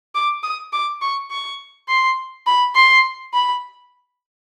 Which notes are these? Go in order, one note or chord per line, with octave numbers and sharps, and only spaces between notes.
D6
D#6
D6
C#6
C#6
C6
B5
C6
B5